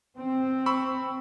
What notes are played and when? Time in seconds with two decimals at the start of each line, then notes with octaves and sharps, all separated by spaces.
0.17 C4
0.66 B5 C#6 E6